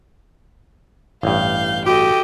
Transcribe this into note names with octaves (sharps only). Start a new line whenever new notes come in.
A1 G2 F5 G6
F#4 G4 A4 D#5 G5